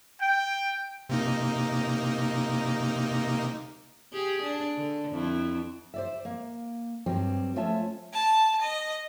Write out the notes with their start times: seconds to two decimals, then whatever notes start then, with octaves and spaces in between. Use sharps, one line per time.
0.21 G5
1.09 C3 A#3 D#4
4.13 G4 G#4
4.43 D4
4.78 D3
5.10 F2 E4
5.94 C5 D5 E5
6.25 A#3
7.06 G2 F#3 G3 C4
7.56 F3 A3 C#4 F4 E5 A5
8.13 A5
8.61 D#5